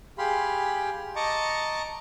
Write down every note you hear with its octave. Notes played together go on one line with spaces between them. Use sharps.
G4 G#4 F5 B5 C6
D#5 A5 A#5 C#6 D6